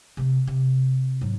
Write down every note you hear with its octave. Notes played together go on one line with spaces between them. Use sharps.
C3 C4
C3 C4
G#2 F#3